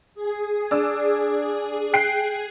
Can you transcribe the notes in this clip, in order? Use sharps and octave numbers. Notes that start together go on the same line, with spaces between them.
G#4
D4 E6
G5 F#6 C7